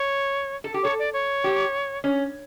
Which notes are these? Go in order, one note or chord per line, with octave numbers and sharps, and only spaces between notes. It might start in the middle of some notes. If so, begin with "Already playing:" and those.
Already playing: C#5
A4
G4
A4 C#5
D5
C#5
G4
C#4